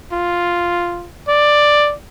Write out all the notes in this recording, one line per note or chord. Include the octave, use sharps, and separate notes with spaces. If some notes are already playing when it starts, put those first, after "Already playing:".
F4
D5